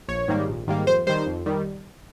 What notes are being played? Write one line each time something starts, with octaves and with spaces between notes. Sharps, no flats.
A#1 C#5
G#2 D#3 G3 A#3
A#1
G#2 D#3 G3 A#3
F2 C5
D#3 G3 C5
F2
D#3 G3